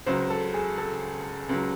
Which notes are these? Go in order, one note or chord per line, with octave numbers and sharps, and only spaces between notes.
C#2 C#3 F#3 C5
A4
G#4
A4
C#2 C#3 F#3